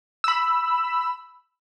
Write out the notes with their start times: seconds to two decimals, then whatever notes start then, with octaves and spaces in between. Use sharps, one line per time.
0.24 B5 E6